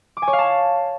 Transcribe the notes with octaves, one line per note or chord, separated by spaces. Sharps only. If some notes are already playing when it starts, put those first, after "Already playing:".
D6
G#5
C#5
F5
A5